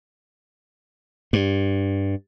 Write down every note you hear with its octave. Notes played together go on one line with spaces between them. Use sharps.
G2